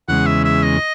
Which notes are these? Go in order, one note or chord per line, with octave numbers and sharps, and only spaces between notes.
E2 C#3 G#3 F#5
E5
E5
D#5